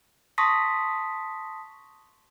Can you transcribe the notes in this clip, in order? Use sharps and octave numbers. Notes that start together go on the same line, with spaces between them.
A5 C6 C#6 D#6 A#6 B6